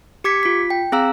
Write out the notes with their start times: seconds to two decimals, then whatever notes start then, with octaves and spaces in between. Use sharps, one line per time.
0.24 G4 D6 G#6 B6 C#7
0.43 F4 B6
0.70 G5
0.92 C4 G#4 F5 A#5 E6